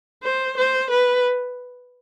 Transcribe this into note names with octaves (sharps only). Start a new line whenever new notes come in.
C5
C5
B4